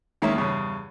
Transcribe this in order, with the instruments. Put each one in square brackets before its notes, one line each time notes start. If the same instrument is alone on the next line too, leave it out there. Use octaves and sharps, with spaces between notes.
[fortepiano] D#3 G#3 A#3 C#4 E5
E2 G2 C#3